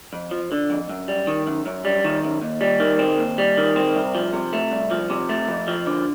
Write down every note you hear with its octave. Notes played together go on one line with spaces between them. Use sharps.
F2
F3
D3
F2
F#2
G3
D#3
F#2
F#2
G3
D#3
F#2
D#2
G3
D#3
C4
D#2
G3
D#3
C4
C2
F3
C3
A3
C2
F3
C3
A3
F2
F3
D3